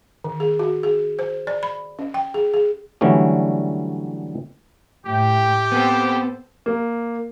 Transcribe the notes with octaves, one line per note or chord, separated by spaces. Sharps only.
D#3
G#4
F#4
G#4
C5
D5
B5
C#4
G5
G#4
G#4
D3 E3 F#3 G3 A3 C#4
A2 G4 G5
B3 C4 A4 C5
A#3